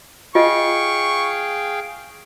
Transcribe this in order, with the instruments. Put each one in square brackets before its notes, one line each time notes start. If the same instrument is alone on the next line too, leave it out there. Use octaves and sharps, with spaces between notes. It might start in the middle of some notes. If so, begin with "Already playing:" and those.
[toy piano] F4 D#5 [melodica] G#4 F5 G5 [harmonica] C#6